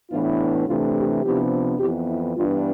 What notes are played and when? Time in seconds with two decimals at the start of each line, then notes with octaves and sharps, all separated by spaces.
0.10 A2 E3 B3 D4 F4
0.39 E4
0.67 C3 E3 A3 D4 F4
0.95 E4 G4
1.23 C3 F3 B3 D4 E4 G4
1.79 F2 E3 B3 E4 G4
2.08 E4
2.36 G2 E3 B3 D4 F4